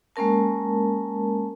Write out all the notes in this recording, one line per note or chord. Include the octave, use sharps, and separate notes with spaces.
G#3 A#3 C#4 A#4 A5